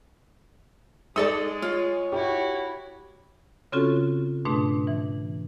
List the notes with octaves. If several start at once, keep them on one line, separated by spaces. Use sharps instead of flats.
G#3 D#4 A4 D5 D#6
F4 C#5
E4 F#4 G4
C#3 C4 C#4 F4 F#4 A4
G#2 B2 A3 D4
E3